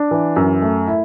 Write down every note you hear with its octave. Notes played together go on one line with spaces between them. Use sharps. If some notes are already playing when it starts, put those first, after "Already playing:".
Already playing: D4
E3
F#2
A3
E4